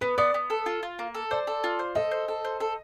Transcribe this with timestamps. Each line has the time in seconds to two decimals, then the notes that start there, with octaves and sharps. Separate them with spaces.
0.01 B3 B4
0.18 B3 D5
0.34 B3
0.50 A4
0.66 F4
0.83 F4
0.99 A#3
1.15 A4
1.31 C5 D5
1.47 A4
1.64 F4
1.79 C5
1.95 A4 D#5
2.11 C5
2.28 A4
2.45 C5
2.60 A4